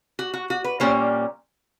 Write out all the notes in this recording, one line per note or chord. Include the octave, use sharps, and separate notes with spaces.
F#4
F#4
F#4
B4
A#2 G3 A#3 C#4 C5